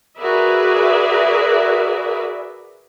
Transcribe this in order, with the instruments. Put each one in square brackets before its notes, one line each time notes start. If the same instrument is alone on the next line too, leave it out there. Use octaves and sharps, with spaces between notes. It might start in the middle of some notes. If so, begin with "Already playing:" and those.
[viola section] F#4 G#4 A#4 B4 D5 E5